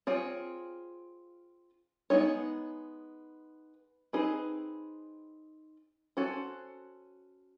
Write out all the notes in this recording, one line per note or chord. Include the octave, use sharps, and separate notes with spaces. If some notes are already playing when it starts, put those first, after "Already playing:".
C4 F4 G#4 C#5
G#3 B3 D#4 G#4 C#5
C4 D#4 G#4 B4
C#4 F#4 A4 C5